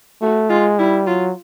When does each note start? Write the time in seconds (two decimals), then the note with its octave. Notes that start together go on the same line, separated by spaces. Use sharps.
0.22 A3 F#4
0.50 G#3 F4
0.79 G3 E4
1.07 F#3 F4